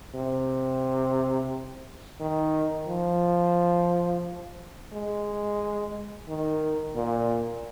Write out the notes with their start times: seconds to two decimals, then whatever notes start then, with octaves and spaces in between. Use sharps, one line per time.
0.15 C3
2.20 D#3
2.88 F3
4.92 G#3
6.28 D#3
6.96 A#2